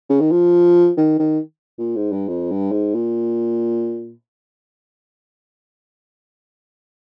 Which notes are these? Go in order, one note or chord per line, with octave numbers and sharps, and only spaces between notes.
C#3
D#3
F3
D#3
D#3
A#2
G#2
G2
F2
G2
G#2
A#2